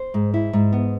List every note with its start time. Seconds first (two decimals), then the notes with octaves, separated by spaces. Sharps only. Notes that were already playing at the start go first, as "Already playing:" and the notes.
Already playing: C5
0.14 G#2
0.34 E4
0.53 G#2
0.72 B3